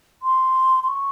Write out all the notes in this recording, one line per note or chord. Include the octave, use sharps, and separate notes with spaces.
C6
C6
C#6